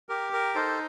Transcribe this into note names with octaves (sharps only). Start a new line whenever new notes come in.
G4 A#4
A#4
D#4 A4 C5